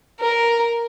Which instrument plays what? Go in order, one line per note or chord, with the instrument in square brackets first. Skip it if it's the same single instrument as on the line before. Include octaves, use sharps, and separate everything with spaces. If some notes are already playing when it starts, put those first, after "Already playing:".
[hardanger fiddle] A#4